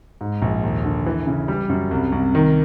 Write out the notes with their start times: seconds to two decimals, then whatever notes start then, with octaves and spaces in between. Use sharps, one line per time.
0.21 G#2
0.42 A#1
0.64 D#2
0.85 D3
1.06 E3
1.27 C#3
1.48 G3
1.69 F#2
1.91 C2
2.12 C2
2.35 D#3